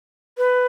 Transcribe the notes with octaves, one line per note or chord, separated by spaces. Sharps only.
B4